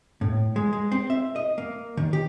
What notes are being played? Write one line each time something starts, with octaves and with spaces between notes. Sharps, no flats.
A2
G#3
G#3
C4
E5
D#5
A#3
D#3
G4